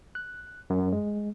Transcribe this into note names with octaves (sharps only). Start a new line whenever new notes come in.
F#6
F#2
G#3